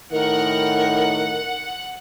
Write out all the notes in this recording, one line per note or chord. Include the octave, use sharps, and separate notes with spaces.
A2 D#3 A#4 F#5